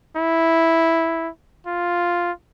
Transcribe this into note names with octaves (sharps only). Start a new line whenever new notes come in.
E4
F4